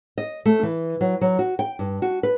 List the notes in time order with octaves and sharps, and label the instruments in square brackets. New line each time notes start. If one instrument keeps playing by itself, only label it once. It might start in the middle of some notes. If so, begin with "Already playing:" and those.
[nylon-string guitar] D#5
A3
E3
F#3
F#3
F#4
G5
G2
F#4
B4